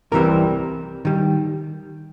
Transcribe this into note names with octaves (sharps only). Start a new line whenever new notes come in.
C2 C3 E3 G3 C4 A#4
D#3 G3